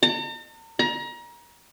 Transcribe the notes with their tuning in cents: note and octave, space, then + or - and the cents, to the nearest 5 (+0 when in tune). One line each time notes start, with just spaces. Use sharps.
A#5 -45
A#5 +30